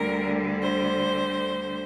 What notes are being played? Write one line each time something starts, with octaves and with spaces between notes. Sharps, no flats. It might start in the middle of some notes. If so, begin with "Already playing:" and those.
Already playing: D2 D3 G3 A#4
C5